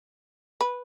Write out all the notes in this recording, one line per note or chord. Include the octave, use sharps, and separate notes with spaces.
B4